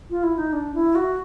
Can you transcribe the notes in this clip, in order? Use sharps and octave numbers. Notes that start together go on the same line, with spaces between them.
F4
E4
D#4
D4
E4
F#4